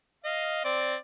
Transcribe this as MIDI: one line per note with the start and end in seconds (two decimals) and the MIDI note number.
0.25 0.64 75
0.25 0.64 77
0.65 0.95 60
0.65 0.95 74